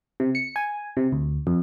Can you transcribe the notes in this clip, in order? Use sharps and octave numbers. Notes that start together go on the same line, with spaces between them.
C3
C#7
G#5
C3
D2
F2